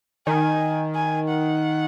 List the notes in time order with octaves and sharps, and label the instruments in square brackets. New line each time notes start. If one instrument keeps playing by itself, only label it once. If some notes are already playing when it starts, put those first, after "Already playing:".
[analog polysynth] D#3 [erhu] G#5
[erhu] G#5
F#5